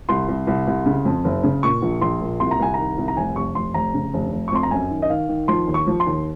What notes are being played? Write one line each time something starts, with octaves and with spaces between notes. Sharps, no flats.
C2 C6
C2
C2
C2
C#3
F2
F#1
C#3
A#2 C#6
A#1
A#1 C6
A#2
C2 C6
A#5
C2 G#5
D#3 A#5
C2
A#5
F1 G#5
F1 C#6
F1 C6
F1 A#5
C#3
F1
F1
C#6
F2 C6
A#5
F#2 G#5
D#3
D#5
D#3 F5
D#3
F3 C6
D#2
C#6
F3
C6
D#2